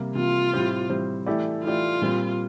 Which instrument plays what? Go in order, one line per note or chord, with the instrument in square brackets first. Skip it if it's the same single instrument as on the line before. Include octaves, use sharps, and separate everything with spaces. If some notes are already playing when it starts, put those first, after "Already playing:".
Already playing: [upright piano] C3 G3 A#3
[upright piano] C3 G3 A#3 [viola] F4
[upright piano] A2 G3 C4 G4 C5
A2 G3 C4 G4 C5
E3 A3 E4 G4 D5
[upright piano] E3 A3 E4 G4 D5 [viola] F4
[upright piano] A#2 G3 C4